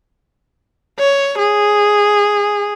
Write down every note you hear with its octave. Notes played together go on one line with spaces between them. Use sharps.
C#5
G#4